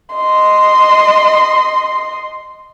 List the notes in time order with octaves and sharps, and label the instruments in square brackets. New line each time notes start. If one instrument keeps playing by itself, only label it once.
[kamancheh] D#5 C6